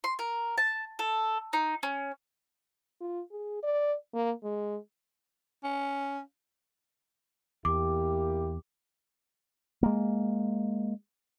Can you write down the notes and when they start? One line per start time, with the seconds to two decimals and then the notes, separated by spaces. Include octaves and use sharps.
0.04 C6
0.19 A#4
0.58 A5
0.99 A4
1.53 D#4
1.83 C#4
3.01 F4
3.31 G#4
3.63 D5
4.14 A#3
4.43 G#3
5.64 C#4
7.65 E2 A#3 E4 G4 D6
9.83 G#3 A#3